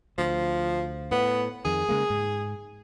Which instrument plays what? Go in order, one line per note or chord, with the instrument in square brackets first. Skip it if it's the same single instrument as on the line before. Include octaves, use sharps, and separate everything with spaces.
[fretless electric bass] D2 [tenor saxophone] F3
[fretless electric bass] A2 [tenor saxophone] B3
[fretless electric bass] F2 D#3 [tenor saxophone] G#4
[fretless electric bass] C#3 G#3 A#3
G#2